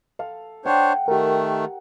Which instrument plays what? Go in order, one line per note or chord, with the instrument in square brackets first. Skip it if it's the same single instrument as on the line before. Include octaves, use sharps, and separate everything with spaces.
[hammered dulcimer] A4 F5
[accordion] D4 C5 C#5 [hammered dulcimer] F#5 G5
[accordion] D#3 A3 [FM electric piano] G4 A#4